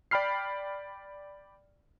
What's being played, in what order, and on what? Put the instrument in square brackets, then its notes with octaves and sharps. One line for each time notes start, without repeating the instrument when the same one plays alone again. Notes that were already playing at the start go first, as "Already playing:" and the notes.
[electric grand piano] D5 G5 B5 F6 C7